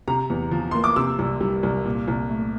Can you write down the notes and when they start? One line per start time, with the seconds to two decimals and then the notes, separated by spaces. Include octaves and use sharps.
0.08 C3 A#5
0.30 E2
0.51 F3
0.71 A#3 C6
0.84 D6
0.96 C3 E6
1.19 C2
1.41 G3
1.63 C2
1.85 A#2
2.08 C2
2.30 A3